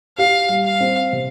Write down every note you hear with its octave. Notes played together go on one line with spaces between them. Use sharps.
G4 F5
G3
F5
C4
C3